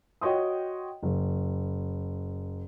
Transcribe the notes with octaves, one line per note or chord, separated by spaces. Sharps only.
F#4 C#5 D#5 G5 C6 D#6
F#1